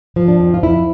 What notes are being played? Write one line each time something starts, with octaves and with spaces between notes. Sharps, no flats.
F3
D4
F2
F4
F2 E4